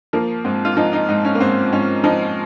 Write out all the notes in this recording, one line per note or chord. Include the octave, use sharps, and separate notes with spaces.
F3 A#3
G#2 C4
F4
F3 D#4
D#4
G#2 D#4
C#4
A#3
G#2 C4
G#2 C#4
F3 D#4